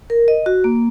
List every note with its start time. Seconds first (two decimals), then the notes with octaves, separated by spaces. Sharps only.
0.10 A#4
0.28 D#5
0.46 F#4
0.64 A#3